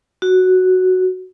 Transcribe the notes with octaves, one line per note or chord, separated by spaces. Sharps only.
F#4